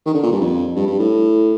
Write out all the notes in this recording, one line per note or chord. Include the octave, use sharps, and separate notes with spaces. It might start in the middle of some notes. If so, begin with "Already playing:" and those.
D#3
D3
A#2
G2
F2
G2
G2
A2